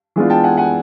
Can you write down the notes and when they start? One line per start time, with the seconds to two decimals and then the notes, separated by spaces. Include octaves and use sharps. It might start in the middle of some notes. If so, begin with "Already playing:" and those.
0.16 E3 G#3 B3 D4 F4
0.30 G5 A5
0.44 F#5 G#5
0.57 F#5 G#5